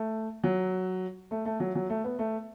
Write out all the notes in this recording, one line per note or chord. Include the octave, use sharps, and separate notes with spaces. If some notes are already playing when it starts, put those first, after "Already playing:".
Already playing: A3
F#3
A3
A3
F#3
F#3
A3
B3
A3